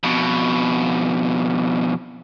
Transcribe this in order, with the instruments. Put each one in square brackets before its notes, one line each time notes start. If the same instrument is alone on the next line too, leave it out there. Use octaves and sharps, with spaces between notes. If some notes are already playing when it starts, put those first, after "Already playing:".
[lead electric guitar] F2 B2